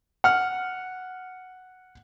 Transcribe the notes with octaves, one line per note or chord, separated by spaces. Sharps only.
F#5 F6